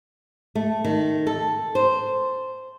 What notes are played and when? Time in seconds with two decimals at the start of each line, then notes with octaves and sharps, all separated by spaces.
0.55 A3
0.84 D#3
1.27 A4
1.75 C5